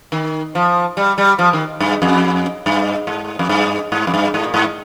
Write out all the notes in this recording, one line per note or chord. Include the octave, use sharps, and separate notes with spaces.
D#3
F3
G3
G3
F3
D#3
G2
F2
G2
G#2
F2
G2
G#2
F2
G2
G#2
A#2
G#2